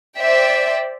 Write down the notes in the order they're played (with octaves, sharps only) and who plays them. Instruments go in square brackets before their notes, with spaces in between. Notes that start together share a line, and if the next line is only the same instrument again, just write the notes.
[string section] C5 D5 E5 G5